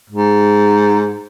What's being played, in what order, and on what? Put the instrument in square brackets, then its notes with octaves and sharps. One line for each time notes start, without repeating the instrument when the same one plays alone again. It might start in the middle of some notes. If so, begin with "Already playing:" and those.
[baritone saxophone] G#2